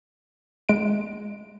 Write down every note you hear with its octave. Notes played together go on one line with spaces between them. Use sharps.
G#3 D7